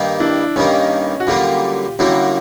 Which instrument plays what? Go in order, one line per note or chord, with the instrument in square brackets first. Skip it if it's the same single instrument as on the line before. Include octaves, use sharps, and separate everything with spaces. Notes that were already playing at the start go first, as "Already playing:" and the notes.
Already playing: [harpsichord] G2 D#3 G3 A#3
[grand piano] D4 E4
[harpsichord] G2 D#3 G3 A#3 [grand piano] C#4 D#4
[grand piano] F#4
[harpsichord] F#2 D3 G3 A#3 [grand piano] F4 G4
[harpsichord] F#2 D3 G3 A#3 [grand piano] E4 F#4